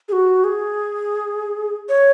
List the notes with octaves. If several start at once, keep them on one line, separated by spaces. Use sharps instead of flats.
G#4
F#4
G#4
C#5